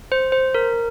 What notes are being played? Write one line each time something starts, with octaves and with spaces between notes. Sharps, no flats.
C5
C5
A#4